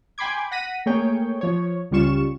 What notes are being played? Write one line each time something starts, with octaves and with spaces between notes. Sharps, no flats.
G5 G#5 B5 C6 D6 G#6
F#5 A#6 B6 D#7
A3 A#3 G#4 C#5 G5
F3 C#5
C#2 C#3 G3 F4 C#6 E7